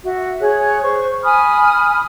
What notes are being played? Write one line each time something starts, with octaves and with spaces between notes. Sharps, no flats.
F#4 E5
G#4 C#5 F#6
C5 C#6
G#5 B5 D#6 F6